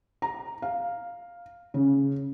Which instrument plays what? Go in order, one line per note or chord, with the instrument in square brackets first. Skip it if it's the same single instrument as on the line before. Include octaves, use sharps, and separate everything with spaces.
[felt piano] A#5
F5
C#3